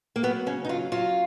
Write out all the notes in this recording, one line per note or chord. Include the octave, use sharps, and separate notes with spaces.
A#3
F#3 B3
C#3 C#4
D#4
F#3 F4
F#3 F4